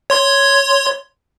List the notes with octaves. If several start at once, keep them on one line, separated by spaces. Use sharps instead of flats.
C#5 C6 G#6